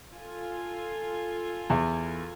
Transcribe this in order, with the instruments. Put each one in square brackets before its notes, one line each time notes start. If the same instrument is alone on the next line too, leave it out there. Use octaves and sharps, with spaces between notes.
[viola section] F4 A4 G#5
[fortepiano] E2